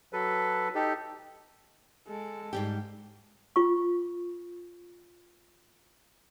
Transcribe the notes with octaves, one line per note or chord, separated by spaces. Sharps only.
F#3 A4 B4
D#4 G4 A4
G#3 A4
G#2 G3 G4
F4 C#6